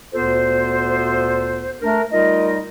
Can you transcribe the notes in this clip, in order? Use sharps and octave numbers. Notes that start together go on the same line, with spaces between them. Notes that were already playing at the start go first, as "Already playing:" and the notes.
D2 A#2 B3 F4 A4 C5
A3 D4 A#4
G3 A3 D#4 F4 A#4 D#5